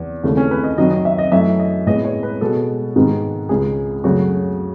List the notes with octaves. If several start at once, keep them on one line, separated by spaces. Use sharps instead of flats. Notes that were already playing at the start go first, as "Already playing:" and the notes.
Already playing: E2
D#2 C#3 E3 A3
C#4
B4
D#5
F#2 D#3 F#3 D#5
D#5
E5
D#5
F#2 E3 A3 E5
D#5
A2 G#3 B3 D#5
C#5
B4
B2 G#3 B3 A4
G#2 D#3 G#3 B3
C#2 C#3 G#3 G#4
F#2 C#3 F#3 A3 F#4